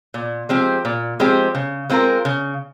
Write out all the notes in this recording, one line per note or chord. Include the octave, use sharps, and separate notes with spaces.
A#2
F3 G#3 C4 G4
A#2
F3 G#3 C4 G4
C#3
G#3 C4 F4 A#4
C#3